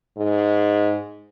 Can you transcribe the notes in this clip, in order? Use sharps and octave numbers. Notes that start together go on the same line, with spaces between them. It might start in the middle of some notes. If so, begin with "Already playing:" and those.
G#2